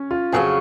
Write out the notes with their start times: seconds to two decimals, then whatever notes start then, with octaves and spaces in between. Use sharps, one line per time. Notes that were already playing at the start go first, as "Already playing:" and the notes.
Already playing: C#4
0.11 F4
0.32 F2 C#3 F#3 C#4 G#4